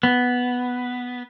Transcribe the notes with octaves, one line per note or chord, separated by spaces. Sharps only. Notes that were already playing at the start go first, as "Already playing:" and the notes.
B3